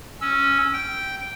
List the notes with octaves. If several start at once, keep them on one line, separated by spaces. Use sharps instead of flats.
C#4 E6
G5